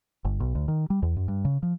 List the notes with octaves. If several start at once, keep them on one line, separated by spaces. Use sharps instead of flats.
G1
B1
D2
D#3
G3
E2
F#2
G2
C#3
F3